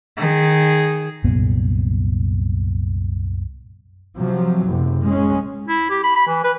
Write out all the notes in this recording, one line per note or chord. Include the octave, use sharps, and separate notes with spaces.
D#3 G#4
C2 F#2 A#2 B3
C3 F3 F#3
F#1 C3
G#3 C#4
E4
G4
B5
B5
E3
B4